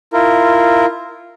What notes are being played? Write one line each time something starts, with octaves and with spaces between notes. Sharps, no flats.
E4 F4 A#4